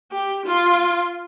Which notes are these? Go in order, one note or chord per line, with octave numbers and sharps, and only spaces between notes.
G4
F4